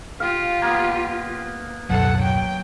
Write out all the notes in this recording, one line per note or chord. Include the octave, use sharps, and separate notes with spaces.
F4 G4 F5
A#3 B3
D1 B1 F#2 A4 F#5
F#3 G5